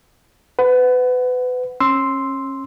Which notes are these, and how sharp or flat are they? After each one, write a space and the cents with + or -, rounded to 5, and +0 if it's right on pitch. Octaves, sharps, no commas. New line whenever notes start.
B4 +30 F#5 +0
C#4 -30 C6 +0 E6 +0